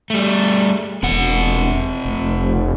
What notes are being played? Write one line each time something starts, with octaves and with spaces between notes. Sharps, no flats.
G3 A3
E1 C3 F#5
F1